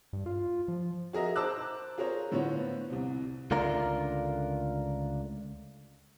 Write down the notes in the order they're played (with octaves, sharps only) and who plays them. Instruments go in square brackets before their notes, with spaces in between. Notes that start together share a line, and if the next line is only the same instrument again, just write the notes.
[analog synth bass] G2
F4
F3
[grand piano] F#4 G#4 A#4 D#5 E5
C5 A5 A#5 D6 E6 F#6
F4 G#4 A#4 C5 C#5
A2 D3 B3 F4 C5 C#5
C2 C3
[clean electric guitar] C#2 D3 A3 D4 F4 A#4